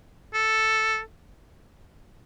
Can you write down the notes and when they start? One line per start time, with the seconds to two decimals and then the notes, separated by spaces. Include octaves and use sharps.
0.34 A4